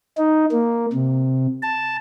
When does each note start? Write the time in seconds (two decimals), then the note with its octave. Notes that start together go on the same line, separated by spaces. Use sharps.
0.18 D#4
0.51 A#3
0.93 C3
1.62 A5